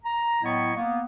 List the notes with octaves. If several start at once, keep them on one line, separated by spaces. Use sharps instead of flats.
A#5
A2 F#3 B3 E4 D#5 C#6
A#3 B3